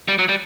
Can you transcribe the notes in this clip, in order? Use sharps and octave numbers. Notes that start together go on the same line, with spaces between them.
G3
F#3
G3